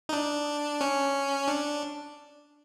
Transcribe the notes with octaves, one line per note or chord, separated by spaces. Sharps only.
D#4
D4
C#4
D4